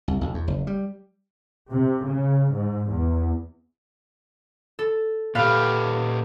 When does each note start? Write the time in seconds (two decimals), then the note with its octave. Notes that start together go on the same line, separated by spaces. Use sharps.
0.08 C2
0.21 B1
0.34 E2
0.48 F#1
0.67 G3
1.71 C3
2.06 C#3
2.51 G#2
2.89 E2
4.79 A4
5.35 A#2 G4 A4 B4 F5